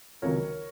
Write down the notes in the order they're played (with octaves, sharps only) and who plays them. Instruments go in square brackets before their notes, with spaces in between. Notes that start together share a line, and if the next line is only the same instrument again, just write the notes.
[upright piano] C#2 C3 D#3 F#3 A#4 C#5